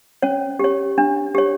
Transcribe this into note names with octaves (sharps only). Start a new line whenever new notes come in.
C#4 C#5
G4 C#5
D4
G4 C#5